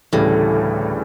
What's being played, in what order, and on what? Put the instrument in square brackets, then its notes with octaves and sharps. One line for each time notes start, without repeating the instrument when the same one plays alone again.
[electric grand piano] D2 C#3 E3 G3 [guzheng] A2